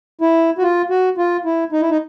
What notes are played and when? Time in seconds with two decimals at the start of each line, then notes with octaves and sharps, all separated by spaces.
0.21 E4
0.58 F#4
0.63 F4
0.90 F#4
1.18 F4
1.45 E4
1.72 D#4
1.81 E4
1.90 D#4